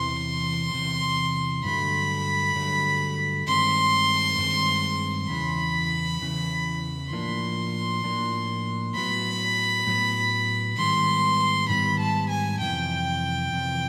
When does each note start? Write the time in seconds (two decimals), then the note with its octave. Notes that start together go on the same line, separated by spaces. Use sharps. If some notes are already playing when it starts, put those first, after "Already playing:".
Already playing: E2 C3 E3 C6
0.73 E2 C3 E3
1.64 G2 D3 F#3 A3 B5
2.56 G2 D3 F#3 A3
3.47 G2 D#3 G#3 C4 C6
4.38 G2 D#3 G#3 C4
5.30 E2 C#3 E3 B5
6.21 E2 C#3 E3
7.12 A2 F3 A#3 D4 C6
8.04 A2 F3 A#3 D4
8.95 A2 F#3 B3 B5
9.87 A2 F#3 B3
10.77 G#2 D#3 G3 B3 C6
11.69 G#2 D#3 G3 B3 B5
12.00 A5
12.30 G#5
12.60 F2 C3 E3 G5
13.52 F2 C3 E3